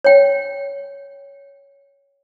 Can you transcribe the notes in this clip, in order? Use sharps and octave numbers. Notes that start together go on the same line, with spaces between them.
C#5 G5